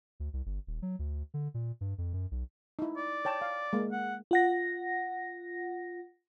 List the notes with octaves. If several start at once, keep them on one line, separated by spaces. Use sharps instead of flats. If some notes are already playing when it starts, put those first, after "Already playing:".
D2
C2
G1
D#1
F#3
D2
D3
A#2
G2
F2
F#2
B1
D#4 E4
D5
C#5 G5 A5
F5
G#3 A#3 F5
F#5
F4 F#5 A#6